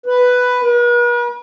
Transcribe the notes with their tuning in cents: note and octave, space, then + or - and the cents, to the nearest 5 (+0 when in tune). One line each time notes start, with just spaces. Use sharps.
B4 +5
B4 -45